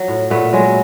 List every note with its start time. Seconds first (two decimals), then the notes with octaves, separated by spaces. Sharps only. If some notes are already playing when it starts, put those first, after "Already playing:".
Already playing: F3 F#3
0.08 A2
0.30 A#2 A3 B3
0.53 F#3 G#3